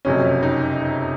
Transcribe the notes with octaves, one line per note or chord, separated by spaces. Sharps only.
F#1 F2 C3 F#3 C#4
D#4